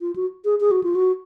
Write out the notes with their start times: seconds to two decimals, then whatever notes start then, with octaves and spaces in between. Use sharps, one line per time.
0.01 F4
0.16 F#4
0.45 G#4
0.60 G#4
0.71 F#4
0.84 F4
0.95 F#4